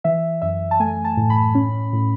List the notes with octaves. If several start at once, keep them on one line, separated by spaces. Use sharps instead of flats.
E3 E5
F#2 E5
A5
A3 G#5
A5
A2
B5
C#4
A2